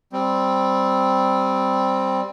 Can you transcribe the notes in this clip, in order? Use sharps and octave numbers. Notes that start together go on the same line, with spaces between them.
G3 C4